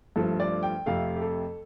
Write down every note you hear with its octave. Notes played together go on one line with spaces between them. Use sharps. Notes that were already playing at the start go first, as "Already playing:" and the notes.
G2 F3 A3 A4
D5
G5
F2 C3 A3 F5
G4
A4